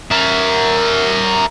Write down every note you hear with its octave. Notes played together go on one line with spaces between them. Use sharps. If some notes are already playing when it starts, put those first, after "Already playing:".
A#4 E5